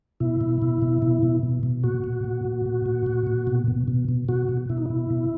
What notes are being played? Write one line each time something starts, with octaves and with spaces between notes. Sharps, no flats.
B2 E4
B2
B2
B2
B2
B2
B2
B2
A#2 F#4
A#2
A#2
A#2
A#2
A#2
A#2
A#2
B2
B2
B2
B2
B2 F#4
B2
B2 E4
D#4
B2 E4
B2